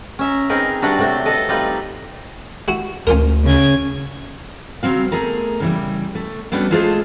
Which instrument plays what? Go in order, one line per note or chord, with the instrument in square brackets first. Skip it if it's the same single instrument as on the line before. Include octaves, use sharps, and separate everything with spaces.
[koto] C#4 E5 A#5
C4 D#4 G#4 A#4 B4
G3 D4 E4 F#4 B4 F#5
C3 F#3 A3 D4 G5
A4 B4 D#5
G3 C4 D#4 F4 B4
[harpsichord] E4 F#4
[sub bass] D2 [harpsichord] C#4 F4 A#4
[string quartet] C#3 G#6
[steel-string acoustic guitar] C#3 F#3 C4 F5
A3 G#4 A#4 A#5
C#3 E3 G3
A3
F#3 G3 A3 B3 C#4 D4
G#3 A3 F4 G#4 C5 A5